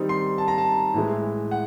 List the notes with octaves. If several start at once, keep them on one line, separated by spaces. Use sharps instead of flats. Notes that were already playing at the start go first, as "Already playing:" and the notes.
Already playing: D#3 G3 C4 D#4
C6
A5
A#5
A5
A2 E3 G#3
F#5